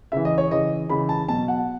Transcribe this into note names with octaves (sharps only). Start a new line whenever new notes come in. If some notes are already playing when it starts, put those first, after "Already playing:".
C#3 E3 E5
D#5
C#5
C#3 E3 D#5
C#3 E3 B5
A5
B2 F#3 A5
F#5